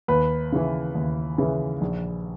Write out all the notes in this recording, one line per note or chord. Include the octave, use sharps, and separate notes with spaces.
D#2 B4
C#3 E3
D#2
C#3 E3
A#1